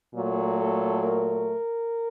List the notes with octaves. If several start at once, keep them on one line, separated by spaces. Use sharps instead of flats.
A#2 F#3 A3
A4
A#4